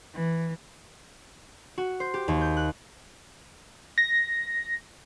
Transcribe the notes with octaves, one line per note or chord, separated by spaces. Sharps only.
E3
F#4
C5
G4
D#2
G6
F#6
A#6